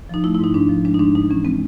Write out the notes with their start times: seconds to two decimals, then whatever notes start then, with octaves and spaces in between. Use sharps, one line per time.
0.09 F3 D#4
0.24 A3 E4
0.35 E4
0.39 G#2 D#4
0.54 G#2 D4
0.69 F3
0.85 G#3 D4
0.94 D#4
0.99 G#2 D4
1.15 G#2 D#4
1.30 E3 C#4
1.45 G#3 C4